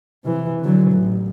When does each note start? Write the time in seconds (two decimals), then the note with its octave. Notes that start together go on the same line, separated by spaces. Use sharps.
0.24 C3 E3
0.61 D3 F#3
0.92 A1